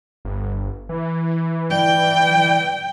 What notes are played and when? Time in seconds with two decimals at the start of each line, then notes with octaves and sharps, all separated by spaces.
0.25 G1
0.89 E3
1.70 D5 G5